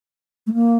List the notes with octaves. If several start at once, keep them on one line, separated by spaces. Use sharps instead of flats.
A3
A#3